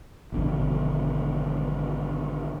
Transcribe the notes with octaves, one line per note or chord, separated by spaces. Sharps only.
G#1 B2 D3 F3